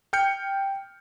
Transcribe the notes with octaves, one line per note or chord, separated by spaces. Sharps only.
G5 F6 G6 C#7